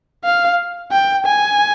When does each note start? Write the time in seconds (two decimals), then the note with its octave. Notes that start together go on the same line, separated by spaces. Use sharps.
0.24 F5
0.92 G5
1.26 G#5